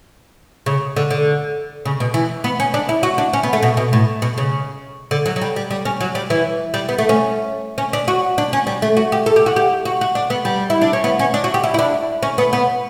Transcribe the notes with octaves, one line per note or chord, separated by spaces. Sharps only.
C#3
D3
D3
C#3
B2
E3
B3
C#4
D4
E4
F#4
D4
C#4
B3
A3
B2
B2
A2
B2
C#3
D3
F#3
F#3
G3
G3
G3
C#4
F#3
G3
E3
G3
B3
A3
C#4
C#4
D4
F#4
D4
C#4
G3
A3
F#4
G4
A4
G4
F#4
G4
F#4
F#4
D4
B3
G3
E4
D4
C#4
B3
C#4
D4
F#4
G4
E4
E4
D4
C#4
B3
B3